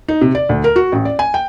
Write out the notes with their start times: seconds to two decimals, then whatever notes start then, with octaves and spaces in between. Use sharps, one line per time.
0.08 D#4
0.21 C3
0.35 D5
0.49 D2
0.64 A#4
0.76 F#4
0.92 A1
1.05 D5
1.19 G#5
1.34 G5